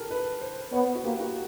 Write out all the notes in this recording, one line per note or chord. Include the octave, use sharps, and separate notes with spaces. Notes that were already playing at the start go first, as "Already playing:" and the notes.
Already playing: G4 A4 A#4
B4
C5
B3 C#5
F#4
A#3 G4
F#4